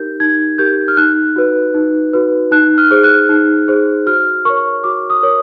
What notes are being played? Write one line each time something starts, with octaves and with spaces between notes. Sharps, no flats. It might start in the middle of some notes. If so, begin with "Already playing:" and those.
Already playing: D#4 G4 A#4 G6
D#4 G#6
G4 A#4 G6
F6
D#4 F#6
F#4 B4
D#4
F#4 B4
D#4 F#6
F6
G#4 C5
F#6
D#4
G#4 C5
F#4 F6
A#4 C#5 C#6
F#4 D6
D#6
A#4 C#5